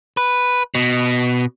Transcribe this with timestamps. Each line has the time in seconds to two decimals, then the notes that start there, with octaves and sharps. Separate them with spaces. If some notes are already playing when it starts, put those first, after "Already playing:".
0.17 B4
0.75 B2